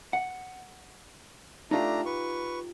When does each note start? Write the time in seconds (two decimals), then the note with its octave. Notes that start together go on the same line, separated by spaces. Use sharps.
0.13 F#5
1.71 A3 D4 D#4 F4 G4 A#5
2.06 B4 C#6